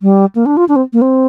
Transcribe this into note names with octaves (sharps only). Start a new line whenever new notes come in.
G3
A#3
D4
F4
D4
C4
A#3
C4